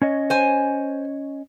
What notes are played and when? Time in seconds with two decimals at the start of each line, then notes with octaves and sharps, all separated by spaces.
0.02 C#4 C#5 D#5
0.30 C5 G#5